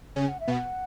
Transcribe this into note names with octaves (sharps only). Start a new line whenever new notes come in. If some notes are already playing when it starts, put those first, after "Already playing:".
C#3 C#4 G#5
F#5
E5
B2 B3 F#5